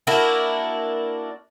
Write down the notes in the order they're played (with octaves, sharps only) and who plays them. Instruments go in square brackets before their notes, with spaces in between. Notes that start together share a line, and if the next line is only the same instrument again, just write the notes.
[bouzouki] A#3 D4 E4 F#4